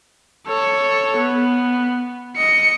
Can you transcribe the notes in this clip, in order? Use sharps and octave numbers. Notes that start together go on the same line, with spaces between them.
A4 C#5
B3
D#5 C#7